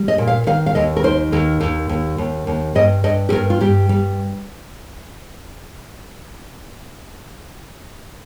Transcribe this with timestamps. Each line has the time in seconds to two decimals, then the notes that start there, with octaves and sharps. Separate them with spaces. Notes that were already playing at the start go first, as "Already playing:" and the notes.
Already playing: G3
0.08 D#5
0.18 A#2
0.27 F5
0.47 D#3 F5
0.66 F5
0.75 D#2 D#5
0.97 A#4
1.04 D#3 C5
1.32 D#2 A#4
1.60 D#2
1.89 D#2
2.18 D#2
2.47 D#2
2.75 G2 D#5
3.04 G2 D#5
3.29 G4
3.32 G2 A#4
3.50 F4
3.61 G2 G4
3.89 G3